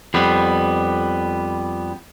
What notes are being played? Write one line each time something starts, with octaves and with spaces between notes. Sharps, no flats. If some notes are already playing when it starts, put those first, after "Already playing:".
F2 G3 B3